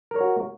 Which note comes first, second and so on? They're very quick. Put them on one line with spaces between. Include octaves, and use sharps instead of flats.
A#4 C#5 F#4